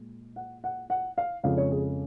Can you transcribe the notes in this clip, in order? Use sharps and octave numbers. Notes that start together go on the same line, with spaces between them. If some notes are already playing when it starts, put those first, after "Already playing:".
Already playing: A#2 G#3
F#5
F#5
F#5
F5
F2 C#3 F3 G#3 F5
C#5
G#4